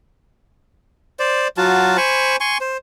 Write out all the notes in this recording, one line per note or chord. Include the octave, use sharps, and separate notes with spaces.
C5 D5
F#3 F4 F#4 A5
C5 G#5 B5 C#6
G#5 C6 C#6
C5